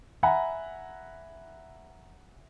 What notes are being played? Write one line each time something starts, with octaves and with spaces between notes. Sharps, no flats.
E5 F#5 G#5 A#5 B5